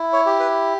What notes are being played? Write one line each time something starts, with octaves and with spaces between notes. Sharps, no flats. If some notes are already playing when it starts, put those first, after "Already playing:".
Already playing: E4
C#5
G4
B4